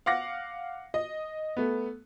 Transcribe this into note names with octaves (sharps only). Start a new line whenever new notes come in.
F5 F#5 D6 A#6
D#5
A3 B3